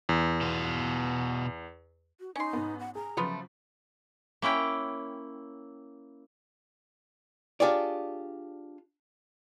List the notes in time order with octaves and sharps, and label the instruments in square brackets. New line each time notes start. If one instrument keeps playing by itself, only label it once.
[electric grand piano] E2
[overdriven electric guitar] B2 F4
[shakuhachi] F#4
[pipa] C#4 C6 [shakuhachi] D#4
[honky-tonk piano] G#2 B3
[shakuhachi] F#5
[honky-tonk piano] G#4 [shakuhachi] A#5
[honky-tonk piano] C#3 F3 F#3 [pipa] A3 B3 F4
[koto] A#3 C#4 E4 G5
[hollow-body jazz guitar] D4 F4 G4 G#4 C#5 D5